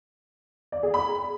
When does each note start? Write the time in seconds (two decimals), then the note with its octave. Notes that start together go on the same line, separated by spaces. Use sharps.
0.72 D5
0.83 G#4
0.94 B5